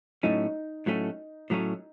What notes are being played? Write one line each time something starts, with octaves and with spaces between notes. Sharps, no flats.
A2 F#3 A3 C#4 D#4
A2 F#3 A3 C#4
A2 F#3 A3 C#4